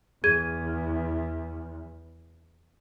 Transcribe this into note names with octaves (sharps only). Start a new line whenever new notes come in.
E2 G#4 G#6 D#7